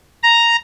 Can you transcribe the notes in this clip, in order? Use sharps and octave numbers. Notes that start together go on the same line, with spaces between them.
A#5